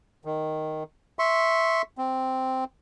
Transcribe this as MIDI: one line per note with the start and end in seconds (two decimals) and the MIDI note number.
0.25 0.84 51
1.19 1.82 76
1.19 1.82 84
1.19 1.82 85
1.98 2.64 60